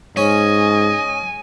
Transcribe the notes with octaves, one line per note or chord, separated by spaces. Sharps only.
G#2 C#4 D#5 G#5